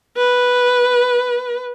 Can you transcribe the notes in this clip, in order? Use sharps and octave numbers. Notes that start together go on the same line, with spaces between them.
B4